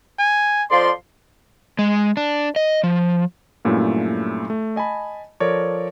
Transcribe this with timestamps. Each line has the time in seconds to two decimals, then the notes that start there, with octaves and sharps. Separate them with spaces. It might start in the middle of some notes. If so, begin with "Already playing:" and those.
0.19 G#5
0.71 F2 F3 D5 C6
1.79 G#3
2.17 D4
2.56 D#5
2.83 F3
3.65 G2 A#2 F#3 A3 C#4 E4
4.50 A3
4.76 D#5 G#5 A5 B5
5.40 F3 A4 A#4 C#5 D5